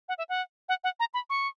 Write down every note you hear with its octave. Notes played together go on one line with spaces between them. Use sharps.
F#5
E5
F#5
F#5
F#5
A#5
B5
C#6